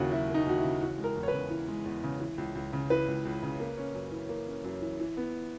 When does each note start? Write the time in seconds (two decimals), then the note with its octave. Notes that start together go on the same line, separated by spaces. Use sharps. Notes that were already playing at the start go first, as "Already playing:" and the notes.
Already playing: D#2 C#3 F#3 A#3 E4 F#4
0.12 F#3 E4
0.29 A#3
0.34 D#4
0.46 D#2 F#4
0.58 E4
0.64 C#3
0.81 E3 F#4
0.98 G#3
1.04 A#4
1.16 E2
1.23 C#5
1.28 B4
1.33 C#3
1.50 E3
1.68 G#3
1.85 E2
2.04 C#3
2.20 E3
2.38 C#2
2.55 C#2
2.73 C#3
2.90 E3 B4
3.08 C#2
3.25 C#2
3.43 C#3
3.60 A#3
3.77 C#4
3.94 F#2
4.12 E3
4.29 A#3
4.46 C#4
4.64 F#2
4.82 E3
5.00 E3
5.17 B3